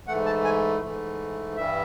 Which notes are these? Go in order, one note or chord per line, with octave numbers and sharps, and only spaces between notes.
G#2 E3 A3 F#5
A5
G#5
G#2 E3 A3
G2 E3 G3 E5